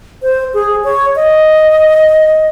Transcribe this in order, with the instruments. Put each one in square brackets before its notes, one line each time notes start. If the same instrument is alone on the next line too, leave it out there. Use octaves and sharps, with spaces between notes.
[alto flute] C5
G#4
C#5
D#5